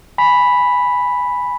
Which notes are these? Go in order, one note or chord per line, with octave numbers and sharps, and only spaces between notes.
G#5 B5 B6